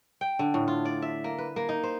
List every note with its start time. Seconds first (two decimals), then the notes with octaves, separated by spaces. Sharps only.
0.21 G5
0.39 D3
0.54 A2
0.68 F4
0.85 D5
1.02 E5
1.24 A#3
1.38 B4
1.56 A#3
1.69 D#4
1.83 C5